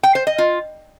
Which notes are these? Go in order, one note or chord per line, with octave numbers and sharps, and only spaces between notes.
G5
C5
D#5
F4